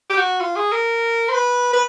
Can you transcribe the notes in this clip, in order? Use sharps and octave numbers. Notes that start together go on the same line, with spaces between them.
G4
F#4
F4
G#4
A#4
C5
B4
B4